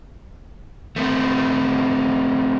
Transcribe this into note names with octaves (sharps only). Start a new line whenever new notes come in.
A3 B3 C4